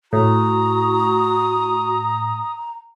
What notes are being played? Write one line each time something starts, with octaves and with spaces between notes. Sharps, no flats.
A2 F#4 A#5 D#6